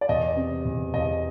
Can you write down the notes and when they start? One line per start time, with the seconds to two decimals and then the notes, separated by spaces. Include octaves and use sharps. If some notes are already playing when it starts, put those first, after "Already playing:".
0.01 D5
0.09 E2 D#5
0.36 C3
0.65 E2
0.94 E2 D#5